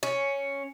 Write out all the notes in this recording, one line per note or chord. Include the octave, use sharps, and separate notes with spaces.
C#4